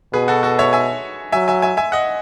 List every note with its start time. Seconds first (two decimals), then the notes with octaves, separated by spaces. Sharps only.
0.13 B2 G#4 B4
0.28 F#4 A4
0.43 F#4 A4
0.59 C#5 E5
0.73 E5 G#5
1.32 F#3 E5 G#5
1.48 E5 G#5
1.62 E5 G#5
1.77 E5 G#5
1.92 D#5 F#5